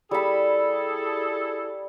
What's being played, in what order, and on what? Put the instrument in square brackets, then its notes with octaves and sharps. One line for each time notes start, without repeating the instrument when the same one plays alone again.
[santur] G3 B5 [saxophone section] E4 G#4 A4